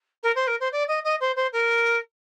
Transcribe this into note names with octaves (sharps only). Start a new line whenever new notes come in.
A#4
C5
A#4
C5
D5
D#5
D#5
C5
C5
A#4